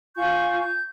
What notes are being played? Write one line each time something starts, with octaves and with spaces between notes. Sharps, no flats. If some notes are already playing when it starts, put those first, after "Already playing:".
F4 G#5 C#6 G6
G6